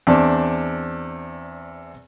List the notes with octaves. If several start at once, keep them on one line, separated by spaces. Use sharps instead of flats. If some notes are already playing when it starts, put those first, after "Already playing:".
E2 C4 D4